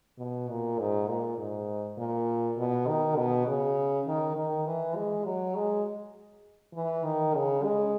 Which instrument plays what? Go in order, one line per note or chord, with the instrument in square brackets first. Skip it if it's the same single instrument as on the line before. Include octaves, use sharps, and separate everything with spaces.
[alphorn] B2
A#2
G#2
A#2
G#2
A#2
B2
D#3
B2
C#3
D#3
D#3
E3
G#3
F#3
G#3
E3
D#3
C#3
G#3